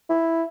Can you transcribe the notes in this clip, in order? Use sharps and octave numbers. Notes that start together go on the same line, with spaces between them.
E4